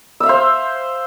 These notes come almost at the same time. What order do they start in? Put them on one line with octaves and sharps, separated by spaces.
E6 E5 F5 C5